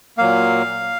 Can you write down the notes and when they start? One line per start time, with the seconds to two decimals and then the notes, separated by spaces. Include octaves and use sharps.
0.18 A#2 F#3 A#3 F5